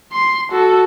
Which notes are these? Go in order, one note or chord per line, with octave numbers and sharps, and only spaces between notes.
C6
F#4 A4